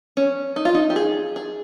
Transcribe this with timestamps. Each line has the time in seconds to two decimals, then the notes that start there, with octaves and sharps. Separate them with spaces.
0.17 C#4
0.56 D#4
0.65 F4
0.74 D#4
0.90 G4
0.96 G#4
1.36 G#4